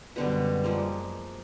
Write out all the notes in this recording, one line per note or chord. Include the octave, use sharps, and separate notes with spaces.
F#2 B2 D3 G3 C4
F3 G#3 A#3